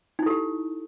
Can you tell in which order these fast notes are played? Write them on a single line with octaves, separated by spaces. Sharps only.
D#4 E4 A4 G4